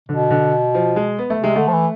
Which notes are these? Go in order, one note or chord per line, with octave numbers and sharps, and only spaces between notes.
B2 D3
D3
F3
G#3
B3
A3
C3 G#3
D3 A3
F3
E3